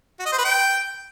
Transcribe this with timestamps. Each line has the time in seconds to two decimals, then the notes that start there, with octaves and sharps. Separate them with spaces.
0.19 F#4
0.26 D#5
0.32 C5
0.38 B4
0.44 G5